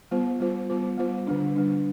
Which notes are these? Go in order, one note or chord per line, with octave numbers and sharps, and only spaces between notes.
G3 B3 F4 C5
G3 B3 F4 C5
G3 B3 F4 C5
G3 B3 F4 C5
D3 G3 D4
D3 G3 D4